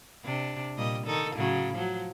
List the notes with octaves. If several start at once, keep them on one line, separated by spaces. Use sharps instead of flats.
C3 D4
A#2 G3 D#5
D#3 D#4 A4
A2 C#3 F#3
F3 F#3